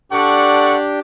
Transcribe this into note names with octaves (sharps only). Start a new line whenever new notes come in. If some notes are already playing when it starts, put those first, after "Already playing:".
D4 G4 A4 D5 F#5 C#6